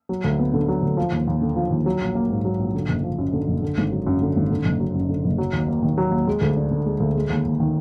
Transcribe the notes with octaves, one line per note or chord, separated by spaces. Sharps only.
F#3
D2
B3
D3
F#3
D2
F3
D#2
D#2
D3
F3
D#2
F#3
A#1
A#3
G#2
F#3
A#1
D3
F#1
F3
F#2
D3
F#1
D3
G#1
F#3
F#2
D3
G#1
D3
F#1
F#3
F#2
D3
F#1
F#3
D#2
A#3
D#3
F#3
D#2
G#3
D2
D4
D3
G#3
D2
G#3
D#2
D#2
D#3